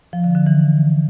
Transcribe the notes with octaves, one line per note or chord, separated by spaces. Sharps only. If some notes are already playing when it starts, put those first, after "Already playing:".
F3
D3
D3
E3